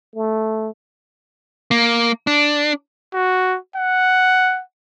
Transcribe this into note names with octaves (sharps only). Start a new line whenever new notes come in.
A3
A#3
D4
F#4
F#5